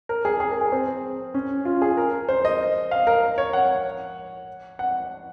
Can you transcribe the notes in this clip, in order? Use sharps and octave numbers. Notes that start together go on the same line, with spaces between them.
A#4
G#4
G#4
A#4
G#4
C4
C#4
F4
G#4
A#4
C5
D#5
F5
A#4
C#5
F#5
F#5